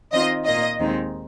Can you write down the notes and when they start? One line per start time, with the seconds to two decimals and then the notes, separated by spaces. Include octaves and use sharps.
0.13 D#3 C4 F4 D#5
0.45 A#2 A#3 F4 D#5
0.79 D#2 D#3 G#3 C4 D#4